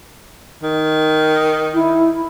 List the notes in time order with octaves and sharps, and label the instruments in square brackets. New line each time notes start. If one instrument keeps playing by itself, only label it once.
[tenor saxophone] D#3
[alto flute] E4